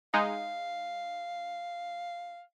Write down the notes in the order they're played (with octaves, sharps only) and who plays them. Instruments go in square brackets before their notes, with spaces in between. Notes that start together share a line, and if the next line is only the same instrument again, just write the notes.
[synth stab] G#3 D#4 [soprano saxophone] F5